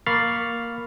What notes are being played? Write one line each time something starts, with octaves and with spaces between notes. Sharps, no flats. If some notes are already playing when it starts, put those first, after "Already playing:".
A#3 B5 C#6 F6 A6 C7